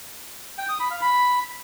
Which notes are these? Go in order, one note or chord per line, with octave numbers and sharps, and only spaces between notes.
G5
D#6
B5
F5
B5